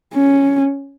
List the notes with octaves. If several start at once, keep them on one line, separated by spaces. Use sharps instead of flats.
C#4